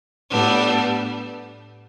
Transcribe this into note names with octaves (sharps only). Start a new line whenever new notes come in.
A2 G3 B3 D4